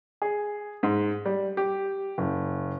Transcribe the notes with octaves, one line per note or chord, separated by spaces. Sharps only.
G#4
G#2
G3
G4
F#1